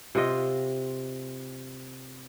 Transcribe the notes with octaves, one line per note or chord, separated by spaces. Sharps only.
C3 F4 D#5